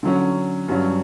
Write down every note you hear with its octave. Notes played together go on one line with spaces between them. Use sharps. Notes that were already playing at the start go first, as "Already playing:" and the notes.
D3 F#3 C#4
G2 F#3 C#4